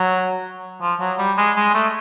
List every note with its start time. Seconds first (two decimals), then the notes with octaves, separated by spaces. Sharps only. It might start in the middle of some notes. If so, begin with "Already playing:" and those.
Already playing: F#3
0.81 F3
1.00 F#3
1.18 G3
1.38 G#3
1.56 G#3
1.75 A3